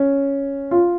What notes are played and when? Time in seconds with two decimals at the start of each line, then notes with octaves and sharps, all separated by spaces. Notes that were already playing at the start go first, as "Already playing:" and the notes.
Already playing: C#4
0.71 F4